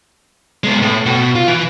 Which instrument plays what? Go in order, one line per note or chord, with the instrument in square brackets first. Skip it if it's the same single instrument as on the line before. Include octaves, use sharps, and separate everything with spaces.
[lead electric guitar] G#3 B3
A2
B2
F4
E3